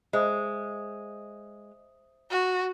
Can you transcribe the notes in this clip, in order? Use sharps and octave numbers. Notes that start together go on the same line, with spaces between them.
G#3 C5 E5 D#6
F#4